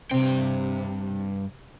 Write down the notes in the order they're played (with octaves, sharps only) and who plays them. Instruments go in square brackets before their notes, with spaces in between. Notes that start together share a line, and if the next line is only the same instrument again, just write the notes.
[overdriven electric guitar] G2 G5 [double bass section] C3 [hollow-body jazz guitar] C4